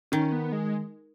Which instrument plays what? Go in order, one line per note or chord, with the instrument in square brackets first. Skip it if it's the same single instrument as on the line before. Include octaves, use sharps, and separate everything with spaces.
[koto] D#3 [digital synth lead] C#4
[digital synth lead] B3
G#3